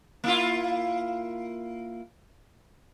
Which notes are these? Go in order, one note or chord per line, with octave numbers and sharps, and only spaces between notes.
A#3 E4 F4